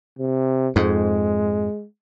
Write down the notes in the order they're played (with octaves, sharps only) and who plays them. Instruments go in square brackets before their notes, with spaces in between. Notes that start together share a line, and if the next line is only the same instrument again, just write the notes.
[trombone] C3
[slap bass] F2 G#2 [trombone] G#3